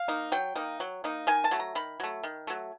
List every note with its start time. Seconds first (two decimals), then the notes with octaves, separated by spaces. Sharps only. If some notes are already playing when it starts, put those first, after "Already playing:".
Already playing: F5
0.08 A#3 D#4
0.32 F#3 G5
0.56 A#3 D#4
0.80 F#3
1.04 A#3 D#4
1.27 D#3 G#5
1.44 A5
1.51 F#3 A3
1.59 A#5
1.75 D#3 B5
2.00 F#3 A3
2.23 D#3
2.47 F#3 A3